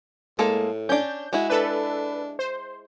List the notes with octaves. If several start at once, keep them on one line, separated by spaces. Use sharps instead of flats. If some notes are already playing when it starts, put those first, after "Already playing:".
A2 G#3 A#3 A4
C#4 D4 G6
G#3 E4 F#4
D4 A4 B4
C5